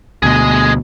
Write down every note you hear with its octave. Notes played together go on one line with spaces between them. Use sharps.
D2 B2 G#4 D#5